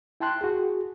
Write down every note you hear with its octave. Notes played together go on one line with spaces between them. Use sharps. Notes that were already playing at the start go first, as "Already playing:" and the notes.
E4 G5 A5 C6 F#6
F#4 G#4